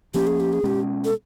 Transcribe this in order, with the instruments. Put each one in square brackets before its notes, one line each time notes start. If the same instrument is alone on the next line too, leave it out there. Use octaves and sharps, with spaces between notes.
[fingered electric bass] F3 A#3 C#4 [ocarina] G4
[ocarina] G#4
G4
G#4
[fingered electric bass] B2 G#3 C#4 [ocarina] G4
[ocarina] A4